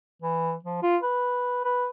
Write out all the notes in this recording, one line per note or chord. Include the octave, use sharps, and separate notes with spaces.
E3
F3
F4
B4
B4